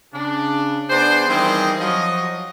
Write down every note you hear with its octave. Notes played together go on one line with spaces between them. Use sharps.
C#3 D4
B3 D4 G#4 C5
D#3 E3 G3 C4 D#4 G#4
F3 F#3 D#5